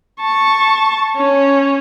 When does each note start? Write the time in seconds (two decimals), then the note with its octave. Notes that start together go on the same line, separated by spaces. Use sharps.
0.21 A5 C#6
1.16 C#4